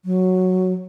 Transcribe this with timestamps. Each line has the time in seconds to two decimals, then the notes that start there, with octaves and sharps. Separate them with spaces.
0.05 F#3